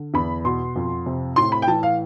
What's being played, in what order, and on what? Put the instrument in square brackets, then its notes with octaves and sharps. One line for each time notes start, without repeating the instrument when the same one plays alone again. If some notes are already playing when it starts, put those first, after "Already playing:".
Already playing: [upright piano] D3
E2 B5
B2 C6
F2
C3
A2 C6
B5
G5
E3 A5
F5